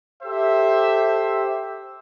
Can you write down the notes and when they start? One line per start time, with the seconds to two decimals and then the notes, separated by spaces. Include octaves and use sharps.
0.23 G4 A4 C5 E5